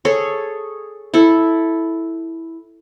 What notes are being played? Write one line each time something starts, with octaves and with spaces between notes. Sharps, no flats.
G#4 A4 C#5
E4 A4